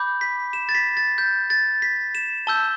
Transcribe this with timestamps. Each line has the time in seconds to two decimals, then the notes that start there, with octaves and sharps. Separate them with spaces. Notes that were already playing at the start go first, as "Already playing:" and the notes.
Already playing: B5 D6 G6
0.21 B6
0.53 E7
0.69 A6
0.75 B6
0.97 A6
1.18 G6
1.50 A6
1.82 B6
2.15 E7
2.47 A5 E6 G6 G7